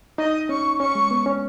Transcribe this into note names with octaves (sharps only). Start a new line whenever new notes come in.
D#4 D#5
C#4 C#6
C#4 C#6
G#3
B3
C#4